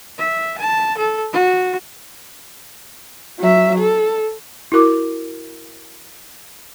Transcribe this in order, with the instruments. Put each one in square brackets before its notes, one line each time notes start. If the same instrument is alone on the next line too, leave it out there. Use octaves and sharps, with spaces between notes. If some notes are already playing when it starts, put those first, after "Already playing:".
[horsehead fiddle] E5
A5
A4
F#4
F#3 E5
A4
[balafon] E4 F#4 A#4 D6